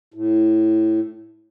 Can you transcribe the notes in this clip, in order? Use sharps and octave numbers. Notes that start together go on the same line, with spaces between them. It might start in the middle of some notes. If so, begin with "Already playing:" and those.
A2